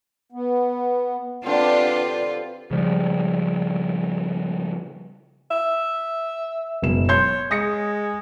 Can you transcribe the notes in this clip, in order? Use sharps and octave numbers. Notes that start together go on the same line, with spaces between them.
B3
D3 C4 D4 F4 G4 B4 F5
C#3 F3 G3
E5
F#1 B2 E7
C#5 C6 G6
G#3 D#6 A#6 C#7